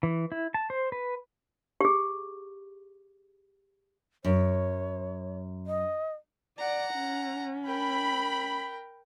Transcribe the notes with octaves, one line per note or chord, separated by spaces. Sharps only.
E3
E4
A5
C5
B4
G4 G#4
F#2 C#5
D#5
D5 F#5 A#5
C#4
A#4 G5 B5